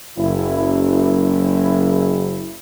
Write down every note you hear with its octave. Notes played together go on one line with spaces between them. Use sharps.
F#1 E4